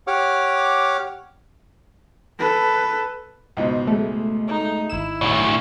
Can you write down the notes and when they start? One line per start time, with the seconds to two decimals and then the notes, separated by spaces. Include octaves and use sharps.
0.07 G4 C#5 F#5 D6 F6
2.38 A4 B4
3.57 C#2 G#2 B2
3.87 G#3 A3
4.47 D#4
4.90 G#1 E4 E7
5.21 D2 A2 C#5